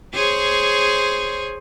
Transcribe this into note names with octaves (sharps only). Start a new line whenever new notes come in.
G#4 C5 C#5